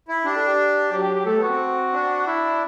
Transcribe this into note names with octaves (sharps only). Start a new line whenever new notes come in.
E4
D4 G4
A4
G4
F#3 G4
G4
G4
A3 A4
B3
F#4
C4
D4
E4